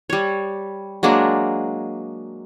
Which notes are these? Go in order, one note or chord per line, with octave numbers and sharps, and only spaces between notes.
G3 C#5
F#3 G#3 A#3 D4